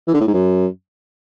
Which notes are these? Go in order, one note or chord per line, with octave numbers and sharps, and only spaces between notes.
E3
D3
A2
G#2
F#2